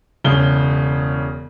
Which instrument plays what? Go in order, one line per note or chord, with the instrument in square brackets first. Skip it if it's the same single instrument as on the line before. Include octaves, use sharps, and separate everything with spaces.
[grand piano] E1 C#3 G7